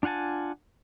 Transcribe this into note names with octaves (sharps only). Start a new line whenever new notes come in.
D4 F4 F#5 G#5 A5